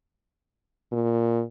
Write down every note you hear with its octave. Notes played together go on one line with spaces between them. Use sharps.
A#2